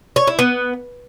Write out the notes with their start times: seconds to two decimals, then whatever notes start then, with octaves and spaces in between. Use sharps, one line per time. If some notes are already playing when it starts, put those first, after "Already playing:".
0.16 C#5
0.27 E4
0.39 B3